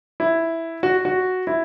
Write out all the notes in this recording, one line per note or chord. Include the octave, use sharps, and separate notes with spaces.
E4
F#4
F#4
E4